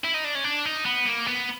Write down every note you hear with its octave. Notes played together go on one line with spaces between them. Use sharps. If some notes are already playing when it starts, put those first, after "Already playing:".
E4
D#4
D4
C#4
D4
D#4
B3
A#3
B3